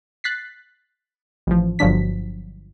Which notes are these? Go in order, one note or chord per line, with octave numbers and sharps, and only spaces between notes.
F#6 A6 B6 C7
A1 F3
G1 F3 F#3 D4 B6